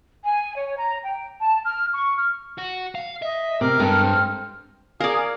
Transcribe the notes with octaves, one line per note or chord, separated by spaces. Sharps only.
G#5
C#5
A#5
G5
A5
F6
C#6
F6
F#4
F5
D#5 E5
C3 A#4 D6 F6
G2 G#3 A4
C4
G#4 A#4 D5 F5